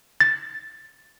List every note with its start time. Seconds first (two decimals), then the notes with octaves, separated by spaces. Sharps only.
0.20 A6